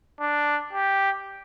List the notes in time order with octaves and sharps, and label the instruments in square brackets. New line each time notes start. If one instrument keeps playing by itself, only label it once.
[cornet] D4
G4